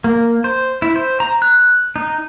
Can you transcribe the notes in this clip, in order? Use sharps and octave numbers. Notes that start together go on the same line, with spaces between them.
A#3
C5
E4
C5
A#5
F#6
D#4